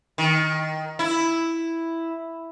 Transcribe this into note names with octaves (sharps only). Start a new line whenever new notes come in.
D#3
E4